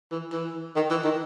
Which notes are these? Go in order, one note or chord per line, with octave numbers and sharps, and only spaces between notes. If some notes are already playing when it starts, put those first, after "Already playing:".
E3
E3
D#3
E3
D#3